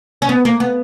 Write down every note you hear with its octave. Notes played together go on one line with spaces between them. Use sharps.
C#4
B3
A#3
B3